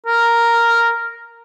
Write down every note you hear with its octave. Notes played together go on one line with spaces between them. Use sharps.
A#4